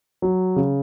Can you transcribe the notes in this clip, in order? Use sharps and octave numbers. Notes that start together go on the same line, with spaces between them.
F#3
C#3